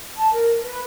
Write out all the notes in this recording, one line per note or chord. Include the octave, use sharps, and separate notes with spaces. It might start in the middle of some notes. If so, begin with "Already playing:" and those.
A5
A#4
B4